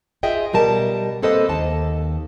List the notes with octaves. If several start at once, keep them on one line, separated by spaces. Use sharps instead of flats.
F4 G#4 D#5 E5 G5
B2 G3 A#4 A5
A#3 C4 A4 B4 C5 D#5
D#2 A5